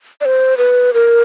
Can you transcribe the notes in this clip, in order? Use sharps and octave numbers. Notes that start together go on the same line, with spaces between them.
D5
C5
B4
A#4